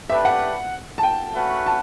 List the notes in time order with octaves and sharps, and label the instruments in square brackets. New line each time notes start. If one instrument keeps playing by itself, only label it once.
[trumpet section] A3 D4 G4 B4 [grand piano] E5
[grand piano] F#5
A5
G5
[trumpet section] A3 C#4 F#4 B4 F#5
[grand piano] A5